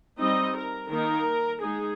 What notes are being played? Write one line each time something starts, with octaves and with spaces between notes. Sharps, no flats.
G3 C4 D#4 D#5
A#4
D#3 A#3 D#4 A#4
G#3 D#4 G#4